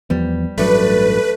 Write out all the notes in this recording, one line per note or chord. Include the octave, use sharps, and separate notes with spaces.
E2 F3 G3 B3
A1 G2 F#3 A3 B4 D5